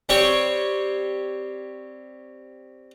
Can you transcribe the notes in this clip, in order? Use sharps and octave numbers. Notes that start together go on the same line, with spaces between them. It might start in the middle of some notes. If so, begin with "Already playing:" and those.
G3 C4 G4 C#5 C#6